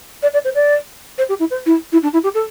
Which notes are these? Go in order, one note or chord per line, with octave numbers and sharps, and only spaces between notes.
D5
D5
C5
D5
C5
G4
E4
C5
E4
E4
D4
E4
G4
A4